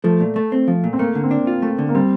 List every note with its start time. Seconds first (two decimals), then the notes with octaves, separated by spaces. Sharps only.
0.04 F3 A3
0.20 A#2
0.36 A3
0.52 C4
0.68 F3
0.84 A#2
0.93 C4
0.99 A3 A#3
1.15 D3
1.23 C4
1.31 D4
1.47 F4
1.62 A3
1.79 D3
1.89 A#3
1.95 G3 C4